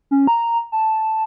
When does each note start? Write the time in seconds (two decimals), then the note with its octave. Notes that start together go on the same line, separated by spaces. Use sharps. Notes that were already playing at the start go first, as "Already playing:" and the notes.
0.11 C#4
0.27 A#5
0.72 A5